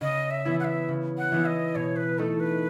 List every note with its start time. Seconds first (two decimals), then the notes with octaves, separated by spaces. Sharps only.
0.01 C#3 D#5
0.31 E5
0.45 E3 B3 E4
0.60 F#5
0.64 E5
0.88 C#3
1.18 F#5
1.32 E3 B3 E4
1.45 D#5
1.75 B2 C#5
1.96 B4
2.18 A3 D#4 A4
2.40 B4